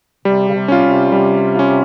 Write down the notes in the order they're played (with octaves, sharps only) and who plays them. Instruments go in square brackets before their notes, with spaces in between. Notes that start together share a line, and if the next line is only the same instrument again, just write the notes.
[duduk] C3 [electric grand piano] G3
[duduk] C#3
C3
[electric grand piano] C#4 F4
[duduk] C3
[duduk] C3 [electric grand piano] G3
[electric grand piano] C#4 F4